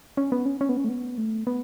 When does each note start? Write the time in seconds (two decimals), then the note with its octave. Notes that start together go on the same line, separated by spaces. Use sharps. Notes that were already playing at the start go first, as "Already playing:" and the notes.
0.17 C#4
0.32 B3
0.46 C#4
0.61 C#4
0.69 B3
0.77 C#4
0.84 A3
0.89 B3
1.18 A3
1.47 B3